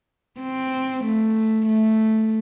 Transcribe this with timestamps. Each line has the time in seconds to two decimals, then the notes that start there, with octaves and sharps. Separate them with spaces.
0.41 C4
1.04 A3
1.67 A3